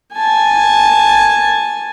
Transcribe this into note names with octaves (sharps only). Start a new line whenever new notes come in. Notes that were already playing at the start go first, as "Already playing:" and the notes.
G#5 A5